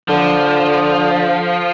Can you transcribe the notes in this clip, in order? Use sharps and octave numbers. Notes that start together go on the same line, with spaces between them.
D3 F3